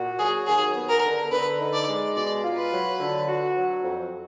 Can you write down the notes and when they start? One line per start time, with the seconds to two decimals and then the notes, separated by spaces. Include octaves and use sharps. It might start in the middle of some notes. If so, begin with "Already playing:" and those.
Already playing: A#2 F#4
0.18 F#3 G#4
0.47 D#2 G#4
0.75 B3
0.89 A#4
1.03 D3
1.31 D3 B4
1.59 D#4
1.73 D5
1.87 G#3
2.16 B2 D5
2.43 F4
2.57 B4
2.72 F#3
2.99 D3
3.28 F#4
3.56 F#3
3.84 F2